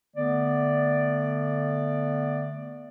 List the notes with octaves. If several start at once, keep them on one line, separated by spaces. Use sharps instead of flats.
D3 A3 B3 D5